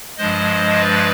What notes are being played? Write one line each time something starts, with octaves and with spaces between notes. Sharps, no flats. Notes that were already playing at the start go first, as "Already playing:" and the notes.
G2 F3 G#3 C5 D#5
B4 D5